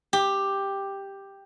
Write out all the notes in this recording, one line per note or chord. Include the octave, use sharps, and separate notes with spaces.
G4